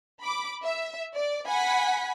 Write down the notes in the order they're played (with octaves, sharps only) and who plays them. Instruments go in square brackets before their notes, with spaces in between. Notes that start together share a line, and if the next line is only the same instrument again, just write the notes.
[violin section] B5 D6
E5
D5
F#5 G#5 B5 B6